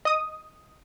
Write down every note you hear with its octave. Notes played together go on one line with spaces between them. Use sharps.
D#5 D#6